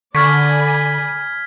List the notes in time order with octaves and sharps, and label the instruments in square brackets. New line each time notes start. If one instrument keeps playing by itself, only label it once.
[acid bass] D3 [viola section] D5 G#5 B5 [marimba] C#6 [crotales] F6 G#6 B6